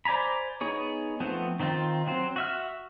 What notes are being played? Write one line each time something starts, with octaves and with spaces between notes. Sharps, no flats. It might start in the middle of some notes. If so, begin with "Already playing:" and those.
C5 D5 G#5 A#5 B5
B3 D#4 G#4 C#5
F3 A3 B3 C4
D#3 C4 D#4 F4
F#3 C4 C5
F#4 E5 F6